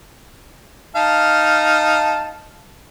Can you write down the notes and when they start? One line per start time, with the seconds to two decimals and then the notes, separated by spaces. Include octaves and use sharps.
0.96 D#4 F5 A5